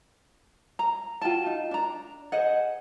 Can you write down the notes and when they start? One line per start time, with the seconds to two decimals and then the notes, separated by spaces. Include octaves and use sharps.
0.79 A#5
1.21 F4 F#4 G5 A5
1.46 D#4
1.71 D4 A#5
2.32 G#4 C5 D#5 F#5